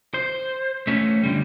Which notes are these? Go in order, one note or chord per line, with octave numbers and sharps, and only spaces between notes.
C5
A3 C#4
D3 G3